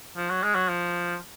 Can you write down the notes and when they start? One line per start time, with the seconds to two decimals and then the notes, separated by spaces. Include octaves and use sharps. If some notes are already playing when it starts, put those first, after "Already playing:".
0.16 F3
0.30 F#3
0.43 G#3
0.55 F#3
0.68 F3